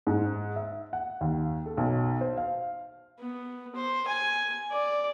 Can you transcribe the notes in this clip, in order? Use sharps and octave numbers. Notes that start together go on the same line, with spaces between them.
G#2
E5
F#5
D#2
A4
B1
C5
F5
B3
C5
G#5
D5